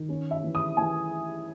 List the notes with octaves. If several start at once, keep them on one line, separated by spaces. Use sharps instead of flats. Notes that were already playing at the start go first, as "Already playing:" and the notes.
Already playing: D#3
C#4
E5
E3
D#6
E3 G#5